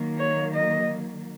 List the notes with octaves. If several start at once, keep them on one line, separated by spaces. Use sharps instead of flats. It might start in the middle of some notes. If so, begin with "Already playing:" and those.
Already playing: D#3 F#3 A#3
C#5
D#5